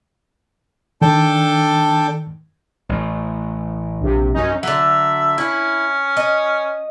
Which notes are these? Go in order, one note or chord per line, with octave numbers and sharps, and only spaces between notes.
D#3 D4 A4 G5
A1 A3
A#1 C3
F#2 C#4 D#4
D3 F#3 E5
C#4 E4
D#5